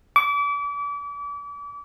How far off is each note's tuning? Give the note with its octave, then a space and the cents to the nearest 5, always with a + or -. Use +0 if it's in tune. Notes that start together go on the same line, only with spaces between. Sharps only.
D6 -35